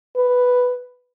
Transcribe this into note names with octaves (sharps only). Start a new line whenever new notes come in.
B4